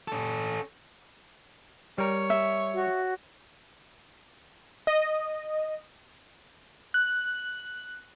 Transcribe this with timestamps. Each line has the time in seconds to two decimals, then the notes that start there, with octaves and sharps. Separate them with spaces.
0.08 C#4 A4
1.98 G3 A#4 C#5
2.30 E5
2.74 F#4
4.87 D#5
6.94 F#6